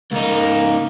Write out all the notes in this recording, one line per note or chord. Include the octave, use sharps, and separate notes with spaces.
C#2 A#3 D#4